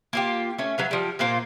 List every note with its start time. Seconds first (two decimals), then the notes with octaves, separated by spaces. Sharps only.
0.13 A#3 F4 G4
0.58 A3 C#4
0.78 F#3 B4 F5
0.91 F3 G3
1.19 A#2 A#3 F4 C5